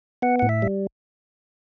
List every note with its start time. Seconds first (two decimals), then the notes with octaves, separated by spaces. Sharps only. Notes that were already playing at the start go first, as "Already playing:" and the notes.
0.22 B3 F#5
0.39 A2 F#5
0.49 E5
0.62 G3